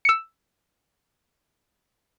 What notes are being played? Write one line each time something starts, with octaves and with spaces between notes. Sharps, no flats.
E6 C#7